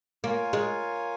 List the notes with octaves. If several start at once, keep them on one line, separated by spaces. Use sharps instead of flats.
A#3 F4 A#4 C#5 F5 G#5
G#3